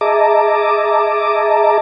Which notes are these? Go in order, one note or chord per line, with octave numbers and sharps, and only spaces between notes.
G#4 D#5 E5 A5 A#5 D6